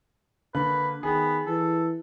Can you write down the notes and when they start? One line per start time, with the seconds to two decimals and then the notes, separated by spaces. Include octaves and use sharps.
0.55 D3 A#3 B4 F#6
1.03 D#3 B3 G#4 G5
1.46 E3 A4